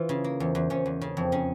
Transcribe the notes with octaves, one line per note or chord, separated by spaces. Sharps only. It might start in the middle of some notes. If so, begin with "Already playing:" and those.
Already playing: E3 F4
C#3
A#3
E2
E2
E2 C#4
E2
C#3
F2
C#3 C#4